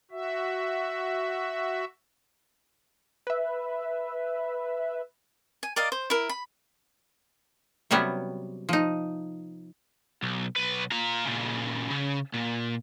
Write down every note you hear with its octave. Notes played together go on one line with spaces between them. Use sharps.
F#4 E5
B4 E5
G#5
A#4 D5 D#5 F5
C5
E4 A#4
B5
C3 F#3 G3 B3 C#4
F3 D#4
B1
B1 B4
F4 A#5
A#2 C#3
C#3
A#2